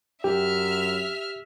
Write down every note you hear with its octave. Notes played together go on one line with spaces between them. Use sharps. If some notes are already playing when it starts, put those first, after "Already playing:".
F#2 G4 E5 F6